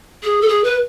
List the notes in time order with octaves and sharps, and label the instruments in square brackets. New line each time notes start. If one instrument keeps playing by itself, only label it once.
[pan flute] G#4
A4
G#4
B4